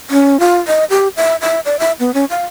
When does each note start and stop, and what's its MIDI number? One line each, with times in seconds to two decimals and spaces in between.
0.10 0.39 61
0.40 0.57 65
0.67 0.84 75
0.90 1.08 67
1.17 1.36 76
1.41 1.60 76
1.65 1.79 74
1.79 1.92 76
2.00 2.13 59
2.14 2.25 61
2.30 2.45 77